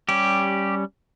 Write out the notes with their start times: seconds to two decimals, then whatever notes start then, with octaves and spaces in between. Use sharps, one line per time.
0.09 G3 C#4 G4